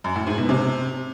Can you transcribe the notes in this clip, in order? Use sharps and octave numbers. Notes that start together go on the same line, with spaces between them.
F#2
A2
G#2
B2
C3